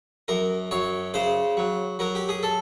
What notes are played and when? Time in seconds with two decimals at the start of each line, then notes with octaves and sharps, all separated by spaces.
0.28 F#2 A#4
0.71 F#2 C#5
1.14 C#3 C5
1.57 F#3
1.99 F#3 A#4
2.15 G4
2.29 G#4
2.43 A4